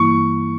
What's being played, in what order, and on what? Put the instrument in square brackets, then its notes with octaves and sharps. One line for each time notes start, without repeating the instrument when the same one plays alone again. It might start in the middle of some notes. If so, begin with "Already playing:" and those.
Already playing: [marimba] G2 E3 G3 A#3 E4 [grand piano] C#6